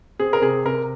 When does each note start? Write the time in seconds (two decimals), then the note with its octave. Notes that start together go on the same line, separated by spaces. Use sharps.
0.20 C4 G#4
0.33 A#4
0.42 C3 G#4
0.65 C3 A#4